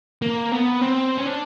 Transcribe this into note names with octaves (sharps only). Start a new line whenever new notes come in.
A#3
B3
C4
C#4
D4